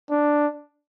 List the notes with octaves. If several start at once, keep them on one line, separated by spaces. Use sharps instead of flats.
D4